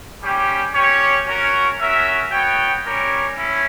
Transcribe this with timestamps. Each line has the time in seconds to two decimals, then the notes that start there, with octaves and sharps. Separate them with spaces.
0.21 G3 C#4 G4
0.74 C#4 G4 C#5
1.26 C#4 F#4 A#4 C#5
1.79 C#4 F#4 A#4 E5
2.32 B3 F#4 C#5 G5
2.84 G3 C#4 G4 A#4 C#5
3.37 C#4 E4